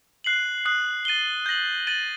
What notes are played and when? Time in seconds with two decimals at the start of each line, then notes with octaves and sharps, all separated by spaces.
0.24 F#6 C7 F#7
0.65 D#6 F#6 C7
1.05 A6 D#7 G7
1.46 G6 A#6 F#7
1.87 A6 D#7 F#7